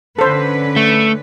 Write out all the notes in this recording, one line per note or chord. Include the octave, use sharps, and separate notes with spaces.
D3 C#4 A4 B4 C5
A3